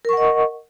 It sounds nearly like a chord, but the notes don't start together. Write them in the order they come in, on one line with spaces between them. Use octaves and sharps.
A#4 C#6 F#5 D#5